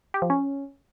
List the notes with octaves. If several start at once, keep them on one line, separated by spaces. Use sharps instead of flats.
G4
F3
C#4